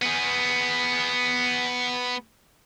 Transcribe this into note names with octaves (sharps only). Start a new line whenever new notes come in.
B3 G#4